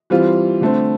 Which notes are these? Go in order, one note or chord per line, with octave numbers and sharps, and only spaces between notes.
E3 G3 C4 F4
D3 A3 C4